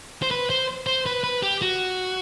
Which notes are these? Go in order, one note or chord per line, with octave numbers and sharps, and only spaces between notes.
C5
B4
C5
C5
B4
B4
G4
F#4